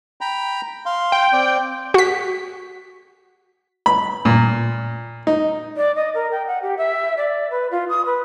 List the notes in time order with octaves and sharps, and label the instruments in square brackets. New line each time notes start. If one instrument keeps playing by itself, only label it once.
[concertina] G5 A#5 B5
F5 C6
[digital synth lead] G5
[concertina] C4 D5
[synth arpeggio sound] F#4 B6
[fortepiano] B5
A#2
D#4
[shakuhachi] D5
D#5
A#4
G5
F#5
G4
E5
D5
B4
F4
D#6
B4